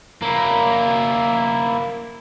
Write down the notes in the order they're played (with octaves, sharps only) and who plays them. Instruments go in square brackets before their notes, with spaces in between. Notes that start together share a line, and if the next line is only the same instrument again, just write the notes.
[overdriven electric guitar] A#3 E4